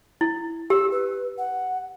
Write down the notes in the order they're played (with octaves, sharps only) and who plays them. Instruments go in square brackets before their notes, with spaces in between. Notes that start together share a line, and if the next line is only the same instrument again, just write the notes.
[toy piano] E4
[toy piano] G4 [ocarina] E6
[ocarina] B4
F#5